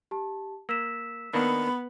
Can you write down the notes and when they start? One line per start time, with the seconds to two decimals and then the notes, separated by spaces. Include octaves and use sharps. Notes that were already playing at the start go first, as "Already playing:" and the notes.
0.11 G4 A5
0.69 A#3 E6 B6 E7
1.33 D#3 A#3 B3 D4 B5